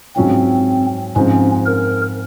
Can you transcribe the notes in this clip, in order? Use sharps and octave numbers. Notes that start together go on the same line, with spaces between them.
G#2 F#3 C4 C#4 F4
G#2 F3 C4 C#4
A#4